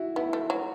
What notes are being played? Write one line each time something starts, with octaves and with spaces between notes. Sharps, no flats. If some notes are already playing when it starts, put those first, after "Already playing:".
Already playing: E4 F#4
B3 E4
A3
F#3